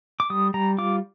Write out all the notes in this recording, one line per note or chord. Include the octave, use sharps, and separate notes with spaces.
D6
G3 D#6
G3 A#5
F4 D6